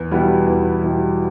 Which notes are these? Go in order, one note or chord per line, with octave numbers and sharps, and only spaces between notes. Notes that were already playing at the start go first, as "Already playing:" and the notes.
Already playing: E2
B2 G3 B3 E4
E2
B2 G3 B3 E4